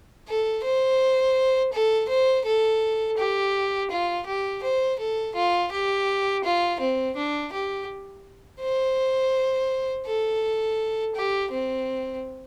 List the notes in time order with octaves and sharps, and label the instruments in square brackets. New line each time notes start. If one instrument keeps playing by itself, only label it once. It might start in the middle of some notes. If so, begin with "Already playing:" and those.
[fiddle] A4
C5
A4
C5
A4
G4
F4
G4
C5
A4
F4
G4
F4
C4
D4
G4
C5
A4
G4
C4